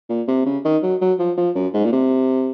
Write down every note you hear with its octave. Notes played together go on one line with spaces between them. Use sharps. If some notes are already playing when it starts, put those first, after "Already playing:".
A#2
C3
C#3
D#3
F#3
F#3
F3
F3
F#2
G#2
A#2
C3